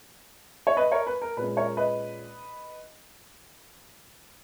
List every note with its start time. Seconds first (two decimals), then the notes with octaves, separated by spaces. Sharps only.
0.67 C#5
0.77 B4 D#5
0.91 A#4 C#5
1.07 B4
1.22 A#4
1.37 A#2 G#3 C#4 B4
1.57 A#4 C#5
1.77 B4 D#5